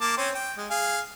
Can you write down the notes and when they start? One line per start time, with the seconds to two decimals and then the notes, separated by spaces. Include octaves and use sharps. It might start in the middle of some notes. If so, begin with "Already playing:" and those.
0.01 A#3 A5 D6
0.17 C4 C#4 C5
0.35 G5
0.57 G#3
0.71 G#4 F5